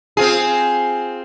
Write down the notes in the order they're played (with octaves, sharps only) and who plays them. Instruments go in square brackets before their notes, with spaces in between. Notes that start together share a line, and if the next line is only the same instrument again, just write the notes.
[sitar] C4 F4 G#4